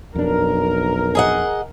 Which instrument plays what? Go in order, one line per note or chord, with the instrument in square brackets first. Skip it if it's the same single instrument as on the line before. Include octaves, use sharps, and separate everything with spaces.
[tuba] B1 [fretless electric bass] F2 D4 [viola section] A#4
[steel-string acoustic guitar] G#4 D#5 F#5